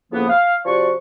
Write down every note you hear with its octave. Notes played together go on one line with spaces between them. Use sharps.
C#2 A2 F3 A#3 B3
F5
C3 F3 F#4 D5 C#6